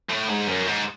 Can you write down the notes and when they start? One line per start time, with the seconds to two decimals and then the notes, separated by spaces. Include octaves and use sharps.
0.10 A2
0.29 G#2
0.48 F#2
0.67 G#2